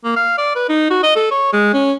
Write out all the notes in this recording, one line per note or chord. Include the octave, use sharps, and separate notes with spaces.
A#3
F5
D5
B4
D#4
F#4
D#5
A4
C#5
G#3
C#4